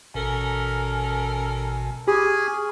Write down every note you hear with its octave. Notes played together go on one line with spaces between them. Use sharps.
A1 B2 C#4 A4 A#4 G#5
G4 G#4 G#5 B5 C#6 F6